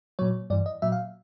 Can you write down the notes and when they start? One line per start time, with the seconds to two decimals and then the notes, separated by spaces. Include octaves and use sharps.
0.19 A#2 F#3 C#5
0.50 G2 E3 D5
0.66 D#5
0.82 A#2 F#3 E5
0.92 F5